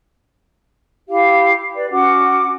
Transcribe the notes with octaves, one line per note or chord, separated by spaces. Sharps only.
E4 G4 F5
B4 D5
C#4 F#4 F#5 D6